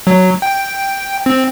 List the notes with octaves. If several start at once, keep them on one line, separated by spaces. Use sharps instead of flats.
F#3
G5
C4